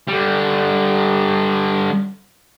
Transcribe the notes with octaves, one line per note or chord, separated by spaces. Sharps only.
D3 G3